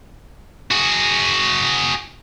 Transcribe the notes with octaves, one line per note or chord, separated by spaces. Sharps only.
F#4 G#4